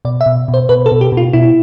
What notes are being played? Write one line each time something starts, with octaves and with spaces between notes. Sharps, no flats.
B2 D5
E5
B2
B2
C5
B2 B4
A4
B2
G4
B2
F4
B2 E4